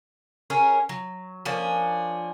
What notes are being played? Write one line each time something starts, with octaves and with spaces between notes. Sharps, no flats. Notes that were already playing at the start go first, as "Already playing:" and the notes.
C#4 G#4 A#4 C#5
F#3
F3 A#3 C#4 D4